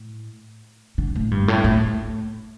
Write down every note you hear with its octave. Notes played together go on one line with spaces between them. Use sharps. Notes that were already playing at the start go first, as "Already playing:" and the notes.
Already playing: A2
D3
A2
G2
A2
A2